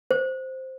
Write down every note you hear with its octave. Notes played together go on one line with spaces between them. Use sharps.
C5